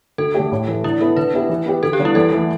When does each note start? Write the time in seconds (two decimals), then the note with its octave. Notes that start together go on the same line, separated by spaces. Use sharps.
0.18 D2 A4
0.34 D3 A3 G4
0.52 A2
0.68 E3 A3
0.84 D3 E4
1.01 B3 E4 A4
1.17 D3 B4
1.34 B3 E4 G4
1.49 E3
1.66 B3 G4
1.83 D2 A4
1.93 G4
1.99 D3 G3 B3
2.05 E4
2.15 E2 A4
2.32 E3 A3